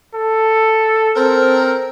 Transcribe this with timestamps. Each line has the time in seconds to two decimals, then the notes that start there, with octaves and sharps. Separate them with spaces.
0.15 A4
1.15 C4 A4 A#4